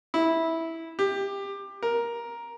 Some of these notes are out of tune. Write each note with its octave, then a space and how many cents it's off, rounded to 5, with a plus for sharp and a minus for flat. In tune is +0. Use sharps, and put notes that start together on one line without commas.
E4 -10
G4 +20
A#4 +10